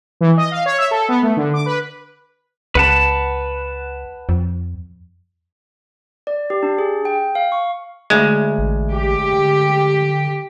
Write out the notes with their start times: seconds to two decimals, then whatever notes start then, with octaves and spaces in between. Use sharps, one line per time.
0.21 E3
0.37 D#5
0.51 F5
0.66 C#5
0.78 E5
0.91 A4
1.09 B3
1.23 A3
1.37 D3
1.54 D6
1.66 B4
2.75 C#2 B4 F#5 A5
4.29 F2
6.27 D5
6.50 G4
6.63 D4
6.78 G#4
7.05 G5
7.35 F5
7.52 C#6
8.10 D2 G#3
8.58 A1
8.91 G4
9.33 D3